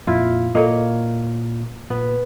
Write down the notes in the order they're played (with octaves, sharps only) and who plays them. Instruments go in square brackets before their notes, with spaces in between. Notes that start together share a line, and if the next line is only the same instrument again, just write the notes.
[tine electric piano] F2 A#2 [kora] E4 F4
[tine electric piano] A#2 [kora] A#3 C#5 [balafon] A4 D#5
[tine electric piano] A#2 [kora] B3